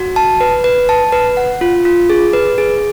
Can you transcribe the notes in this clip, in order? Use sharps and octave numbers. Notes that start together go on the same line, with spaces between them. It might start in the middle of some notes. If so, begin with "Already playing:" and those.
Already playing: F#4
A5
B4
B4
A5
B4
F#5
F4
F4
G#4
B4
G#4